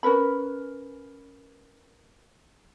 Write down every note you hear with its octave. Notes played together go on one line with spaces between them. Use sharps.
C#4 A#4 B4 B5